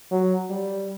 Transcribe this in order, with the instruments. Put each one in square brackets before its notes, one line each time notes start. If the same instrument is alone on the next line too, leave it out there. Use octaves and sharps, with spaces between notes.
[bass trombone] F#3
G3